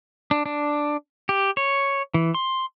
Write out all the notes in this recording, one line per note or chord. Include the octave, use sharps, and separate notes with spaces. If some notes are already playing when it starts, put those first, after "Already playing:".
D4
D4
G4
C#5
E3
C6